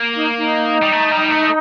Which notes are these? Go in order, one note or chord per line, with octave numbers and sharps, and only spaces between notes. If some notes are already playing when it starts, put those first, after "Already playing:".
Already playing: A#3
D#4
D#4
G3
A3
G3
A3